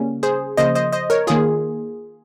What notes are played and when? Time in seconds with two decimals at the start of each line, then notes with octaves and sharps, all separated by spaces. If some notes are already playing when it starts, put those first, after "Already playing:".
Already playing: C#3 G3 A#3 C#4
0.23 G#4 C5
0.57 C#3 F3 A#3 C5 D#5
0.75 C5 D#5
0.93 C5 D#5
1.10 A#4 C#5
1.27 D#3 A#3 F4 G#4